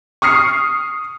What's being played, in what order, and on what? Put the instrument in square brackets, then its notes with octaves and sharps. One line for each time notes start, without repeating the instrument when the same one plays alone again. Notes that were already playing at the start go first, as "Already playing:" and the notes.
[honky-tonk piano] C#6 D#6 F6 C7 C#7